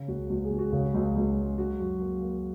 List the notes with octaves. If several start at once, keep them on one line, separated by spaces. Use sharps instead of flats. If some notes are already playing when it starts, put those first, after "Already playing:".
Already playing: C#3
C#2 F#4
C#2 F#4
G#4
C#2
F#4
C#3
C#2
C#2
G#3
F#3 F#4
F#2
A#3
A#3